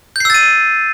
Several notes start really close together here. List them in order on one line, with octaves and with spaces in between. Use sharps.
G6 C7 E6 A6 D#7